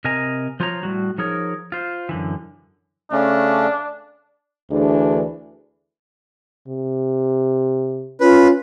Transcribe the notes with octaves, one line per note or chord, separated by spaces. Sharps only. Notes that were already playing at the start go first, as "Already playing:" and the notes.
C3 A#4 D#5 G#5 A#5
F3 F4 C5 C#5 A#5
A2 G3 F#4
F3 D#4 G#4 A#4 C#5
F4 C5
F#2 D3 E3
C#3 A3 C#4 D4
D2 E3 D4 G#4
C3
C#4 F4 B4